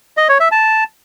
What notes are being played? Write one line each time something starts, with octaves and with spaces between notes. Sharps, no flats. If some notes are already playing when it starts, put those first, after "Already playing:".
D#5
C#5
E5
A5